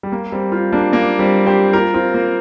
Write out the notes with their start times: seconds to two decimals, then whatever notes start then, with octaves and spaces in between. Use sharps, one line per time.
0.03 G3
0.12 A#3
0.32 G3 C4
0.52 C4 F4
0.73 A#3 D4
0.92 A#3 D4
1.19 G3 C4
1.46 G4 C5
1.73 F4 A#4
1.94 C4 F4
2.14 A#3